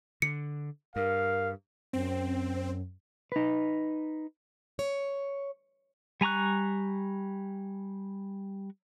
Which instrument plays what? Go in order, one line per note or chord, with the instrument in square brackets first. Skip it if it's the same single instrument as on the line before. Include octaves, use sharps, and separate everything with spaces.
[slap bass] D3 [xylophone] C#7
[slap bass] G2 [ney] A#4 [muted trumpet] F5
[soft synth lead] F#2 [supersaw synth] C4
[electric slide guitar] D#4 B4
[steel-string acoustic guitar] C#5
[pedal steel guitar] G3 G#5 A#5 C#6 F#6